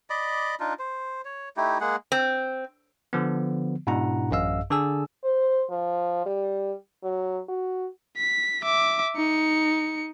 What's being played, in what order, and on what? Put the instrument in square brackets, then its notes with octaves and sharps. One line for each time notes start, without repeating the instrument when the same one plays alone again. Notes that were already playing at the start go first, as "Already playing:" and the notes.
[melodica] D5 D#5 B5 D6
D4 D#4 F4
C5
C#5
A3 D#4 E4 G4
G#3 A#3 G#4 F#5
[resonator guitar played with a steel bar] C4
[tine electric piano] D3 F3 B3
G#2 B2 D4 E4 F#5 A#5
A1 F#2 D#5 F5 E6
D3 D4 G#4 A4 G#5 E6
[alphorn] C5
F3
G3
F#3
F#4
[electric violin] B6
E5 D6
D#4 C#7